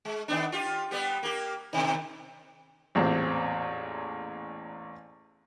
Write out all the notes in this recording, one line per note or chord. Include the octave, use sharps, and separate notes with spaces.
G#3
D#3 B3 D4
F4 G4
G3 B3 G4
A#3 G4
B2 D#3
A1 E2 A#2 C4